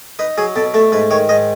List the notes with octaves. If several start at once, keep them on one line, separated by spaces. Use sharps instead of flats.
D#4 B4
F#3 G#4
B2 A4
A3 A4
G#2 B4
D#3 C#5
G#2 D#5